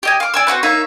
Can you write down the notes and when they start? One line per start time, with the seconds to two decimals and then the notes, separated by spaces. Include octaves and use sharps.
0.03 G4 D#5 G#5
0.20 F5 D6
0.34 D5 G#5 E6
0.47 C4 D#4 F#4 B4
0.63 A#3 D#4 C#5 E5